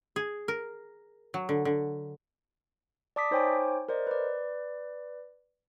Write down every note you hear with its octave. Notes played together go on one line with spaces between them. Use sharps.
G#4
A#4
F#3
D3
D3
D5 A5 D6 D#6 B6
D#4 C5 C#5 G5 G#5 D6
A#4 C5 D5 D#5
B4 D5